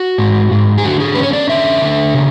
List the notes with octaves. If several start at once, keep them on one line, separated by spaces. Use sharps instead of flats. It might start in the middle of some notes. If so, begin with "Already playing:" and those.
Already playing: F#4
G#2
G#2
G#4
D3 F#4
G#4
C#4 B4
C#5
D5
D3 E5
D3
C#3